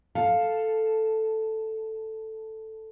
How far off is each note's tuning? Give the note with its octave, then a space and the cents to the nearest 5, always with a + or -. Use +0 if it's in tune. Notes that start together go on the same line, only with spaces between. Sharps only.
A4 +0 F5 +0